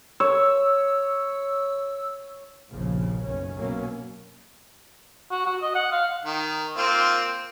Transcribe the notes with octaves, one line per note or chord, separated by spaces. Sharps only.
C#5 E6
F1 A#1 C#3 F3
F#1 B1 C#4
B2 F#3 A#3 C#4
F#4
F#4
D#5
F#5
F5
D#3
A#3 C4 F4